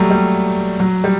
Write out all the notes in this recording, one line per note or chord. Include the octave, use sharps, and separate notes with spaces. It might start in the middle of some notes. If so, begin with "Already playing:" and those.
Already playing: F#3 G3 A3
G3
F#3
G3